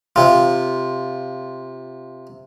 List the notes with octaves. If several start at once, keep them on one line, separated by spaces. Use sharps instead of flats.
C3 F4